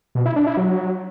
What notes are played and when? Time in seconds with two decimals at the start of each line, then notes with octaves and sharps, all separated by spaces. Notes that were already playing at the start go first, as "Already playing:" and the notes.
0.15 B2
0.26 E4
0.36 D4
0.47 E4
0.57 F#3